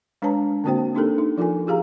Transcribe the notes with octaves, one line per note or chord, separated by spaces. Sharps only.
G#3 D4 B4 C#5 A5 A#5
D3 A#3 C4 F#4 C5 G5
A#3 D4 D#4 G4 A4 A#4
D#4
F3 F4 A4 A#4 G#5
F4 G4 G#4 F5 A#5